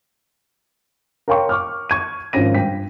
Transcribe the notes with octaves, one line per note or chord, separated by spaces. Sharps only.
A#4 C#5 F5 G5 C6 C#6
C#6 D6 F6
C#6 G#6 D#7
G#1 F3 C#4 A#6 D#7
G2 G5 B6